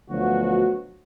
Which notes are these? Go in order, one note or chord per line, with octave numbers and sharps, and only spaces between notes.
D2 B2 F3 F#3 F#4